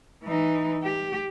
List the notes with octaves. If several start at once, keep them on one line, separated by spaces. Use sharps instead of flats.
E3 D#4
G4